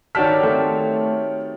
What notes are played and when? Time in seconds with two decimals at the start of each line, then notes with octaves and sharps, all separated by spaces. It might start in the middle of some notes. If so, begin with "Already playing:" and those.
0.15 D#3 F#4 G4 C#5 D5 A5 F6 B6
0.43 A3 C4